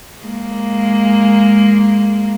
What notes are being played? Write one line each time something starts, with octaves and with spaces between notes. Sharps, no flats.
G#3 A#3